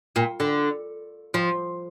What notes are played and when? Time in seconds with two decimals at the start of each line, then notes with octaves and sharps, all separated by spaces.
0.16 A#2
0.40 D3
1.34 F3